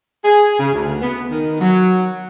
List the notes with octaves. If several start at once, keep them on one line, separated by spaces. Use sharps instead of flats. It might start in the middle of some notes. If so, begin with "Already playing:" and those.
G#4
C#3
D2
B3
D#3
F#3